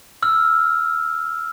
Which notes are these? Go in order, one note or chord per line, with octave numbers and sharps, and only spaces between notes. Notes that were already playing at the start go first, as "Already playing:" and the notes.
E6 F6